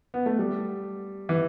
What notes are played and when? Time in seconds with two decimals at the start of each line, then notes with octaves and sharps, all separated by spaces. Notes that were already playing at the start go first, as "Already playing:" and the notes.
0.14 B3
0.26 A3
0.39 G3
1.29 E3